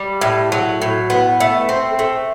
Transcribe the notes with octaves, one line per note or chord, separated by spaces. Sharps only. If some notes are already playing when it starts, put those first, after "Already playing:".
Already playing: G3
A2
F#3
A2
B3
A3
C4
A3